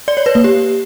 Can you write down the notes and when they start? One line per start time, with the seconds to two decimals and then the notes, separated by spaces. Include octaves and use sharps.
0.08 D5
0.17 C#5
0.26 B4
0.35 A#3
0.44 G4